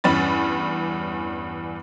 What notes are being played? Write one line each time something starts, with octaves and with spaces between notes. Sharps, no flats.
E2 G2 C#4 B5 A6